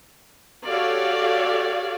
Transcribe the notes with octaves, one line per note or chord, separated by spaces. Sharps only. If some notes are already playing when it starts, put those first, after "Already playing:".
F#4 G4 A4 C#5 D5 F5